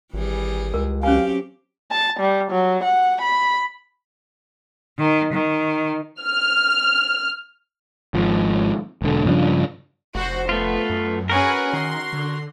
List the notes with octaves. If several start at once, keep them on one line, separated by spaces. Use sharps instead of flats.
G#1 E3 G3 G#4
C#2 A#4
F#3 C4 C#4 G4 F5 G#5
A5
G3
F#3
F#5
B5
D#3
D#3
F6
G#1 F3
E1 D3
G2 C#3 F3 D4
F1 F#4 C5
A3 B3 F4
F#2
C#4 F#4 G#4 A#4 B4
D#3 C6
D3